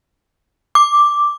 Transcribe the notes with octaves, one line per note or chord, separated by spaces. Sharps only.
D6